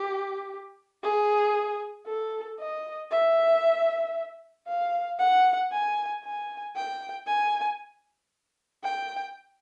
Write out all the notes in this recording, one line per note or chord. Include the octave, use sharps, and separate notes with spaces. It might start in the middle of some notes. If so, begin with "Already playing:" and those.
Already playing: G4
G#4
A4
D#5
E5
F5
F#5
G#5
G#5
G5
G#5
G5